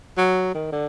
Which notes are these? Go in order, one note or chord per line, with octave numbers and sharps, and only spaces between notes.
F#3
D#3
D3